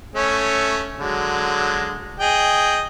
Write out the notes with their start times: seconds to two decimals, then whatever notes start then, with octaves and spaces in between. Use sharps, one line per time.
0.15 A3 C#4 C#5
0.99 D3 F#3 G#3
2.20 G#4 D#5 G5